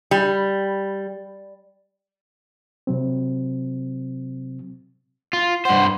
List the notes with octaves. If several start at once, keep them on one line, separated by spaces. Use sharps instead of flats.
G3
C3 F#3 C4
F4
G2 C5 F#5